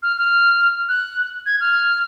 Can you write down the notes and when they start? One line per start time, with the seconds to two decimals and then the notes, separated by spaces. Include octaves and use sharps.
0.03 F6
0.17 F6
0.89 F#6
1.46 G#6
1.60 F6